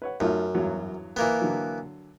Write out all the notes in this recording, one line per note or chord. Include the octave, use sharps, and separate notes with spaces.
B4 C#5 F#5
F#2 A3 D#4 F4
E2 G2 F#3
E3 A#3 B3
D3 F#3